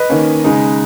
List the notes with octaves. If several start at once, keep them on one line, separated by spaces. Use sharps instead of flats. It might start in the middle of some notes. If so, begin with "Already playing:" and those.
Already playing: B4 D#5
D#3 A#3 C#4
C#3 G#3 D#4